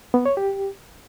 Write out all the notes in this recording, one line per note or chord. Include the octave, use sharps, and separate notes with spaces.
B3
C#5
G4